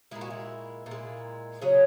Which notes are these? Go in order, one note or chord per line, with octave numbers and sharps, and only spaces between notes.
A#2 G#3 E4
F#4
E4
A#2
G#3
C#3 F#3 G#4